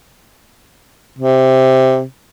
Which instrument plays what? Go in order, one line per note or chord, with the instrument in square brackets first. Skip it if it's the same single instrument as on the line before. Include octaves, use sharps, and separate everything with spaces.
[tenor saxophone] C3